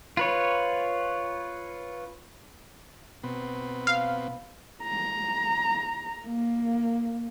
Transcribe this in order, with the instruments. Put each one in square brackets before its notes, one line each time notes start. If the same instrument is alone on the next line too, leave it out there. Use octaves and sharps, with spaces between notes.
[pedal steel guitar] F4 B4 C#5
[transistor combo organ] B2 B3 C4
[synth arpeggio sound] F5
[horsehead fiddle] A#5
A#3